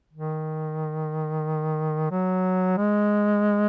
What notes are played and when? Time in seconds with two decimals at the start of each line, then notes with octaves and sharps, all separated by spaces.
0.13 D#3
2.11 F#3
2.77 G#3